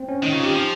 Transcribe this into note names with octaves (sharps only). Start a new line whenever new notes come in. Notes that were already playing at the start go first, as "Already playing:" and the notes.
Already playing: C4
C#4
D#3 D#4
C#3 F4
D#3 G4
F3